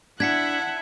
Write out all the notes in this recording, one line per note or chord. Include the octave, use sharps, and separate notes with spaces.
D4 E4 E5 F#5 G#6 B6 C#7